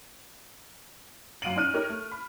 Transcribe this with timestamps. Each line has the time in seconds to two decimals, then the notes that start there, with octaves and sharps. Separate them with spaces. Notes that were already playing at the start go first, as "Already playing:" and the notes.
1.42 F#2 F5 F#5 D7 D#7 F#7
1.56 C#4 D#4 D5 F6 F#6 D#7
1.74 D#4 G4 A#4 C#5
1.89 A3
2.12 B5